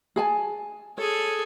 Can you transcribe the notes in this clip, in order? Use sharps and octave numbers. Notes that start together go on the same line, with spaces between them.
G#4 G#5 A5
G#4 A4 C#5